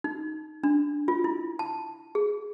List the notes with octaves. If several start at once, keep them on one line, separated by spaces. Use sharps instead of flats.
D#4
D4
F4
E4
A5
G#4